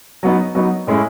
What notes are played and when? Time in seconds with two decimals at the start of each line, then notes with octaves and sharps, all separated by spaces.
0.23 F#3 B3 D#4
0.55 F#3 B3 D#4
0.87 A2 G#3 C#4 E4